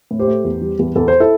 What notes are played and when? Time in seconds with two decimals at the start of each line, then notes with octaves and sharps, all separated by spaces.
0.11 A2
0.19 G4 C5
0.27 A3
0.44 E2
0.61 G3
0.79 E2
0.96 E2 A4
1.08 C5
1.20 E4 A4